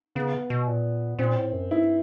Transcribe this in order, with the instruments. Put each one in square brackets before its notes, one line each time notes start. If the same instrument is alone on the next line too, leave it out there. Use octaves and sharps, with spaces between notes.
[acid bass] C#3 [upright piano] B3
[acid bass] B2
A#2
[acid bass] A#2 [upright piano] C4
[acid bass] A2
F#2
[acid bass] G2 [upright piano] E4